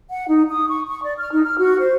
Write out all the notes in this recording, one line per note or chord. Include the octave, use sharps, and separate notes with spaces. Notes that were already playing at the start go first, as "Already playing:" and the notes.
F#5
D#4
D#6
C#6
C#6
D5
F6
D#4
F6
F#4
C5